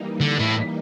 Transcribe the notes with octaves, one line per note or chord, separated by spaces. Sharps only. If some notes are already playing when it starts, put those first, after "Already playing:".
Already playing: E3 G3 A#3 D#4
D3
A2